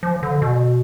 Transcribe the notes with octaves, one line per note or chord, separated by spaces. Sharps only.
F3
D3
B2